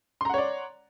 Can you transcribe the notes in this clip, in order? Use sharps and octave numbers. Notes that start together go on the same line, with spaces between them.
C#5 D5 F#5 A#5 C6